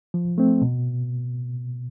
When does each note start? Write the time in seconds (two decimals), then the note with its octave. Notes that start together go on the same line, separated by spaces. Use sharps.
0.14 F3
0.38 A3 C4
0.62 B2